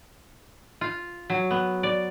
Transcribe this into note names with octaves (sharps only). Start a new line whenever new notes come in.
F4
F#3
B3
D5